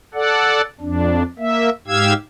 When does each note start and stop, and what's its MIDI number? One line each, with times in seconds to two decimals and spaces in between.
0.14 0.61 69
0.14 0.61 74
0.14 0.61 78
0.81 1.23 41
0.81 1.23 62
1.39 1.69 58
1.39 1.69 76
1.88 2.13 44
1.88 2.13 67
1.88 2.13 77
1.88 2.13 88
1.88 2.13 92